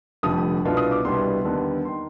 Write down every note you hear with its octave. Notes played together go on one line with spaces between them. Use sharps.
F1 F2 D3 G3 D#6
C2 B2 B3 D4 F4
D#6
D6
C2 B2 G3 B3 D4 C6
D#2 D3 G3 B3
D#3 C6